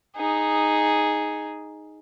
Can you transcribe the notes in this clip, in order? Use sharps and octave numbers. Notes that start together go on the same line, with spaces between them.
D#4 G#4